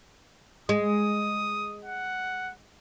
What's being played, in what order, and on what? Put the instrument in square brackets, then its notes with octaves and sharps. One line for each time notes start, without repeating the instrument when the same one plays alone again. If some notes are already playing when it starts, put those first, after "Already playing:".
[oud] G#3 [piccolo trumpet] D#6
[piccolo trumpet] F#5